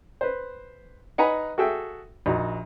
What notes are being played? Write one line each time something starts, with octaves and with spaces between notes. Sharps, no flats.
B4 C5
D#4 B4 F#5 G#5 A#5 B5
F#4 G#4 A4 E5 G5
A#1 D#4 F#4